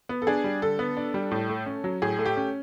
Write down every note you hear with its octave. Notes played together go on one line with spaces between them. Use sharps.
B3
A4
D4 G#4
G3
D3 A4
B3
D4
G3
A2
A3
C#4
F#3
A2 G#4
A3
G4
C#4